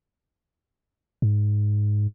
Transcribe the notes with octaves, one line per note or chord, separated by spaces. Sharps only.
G#2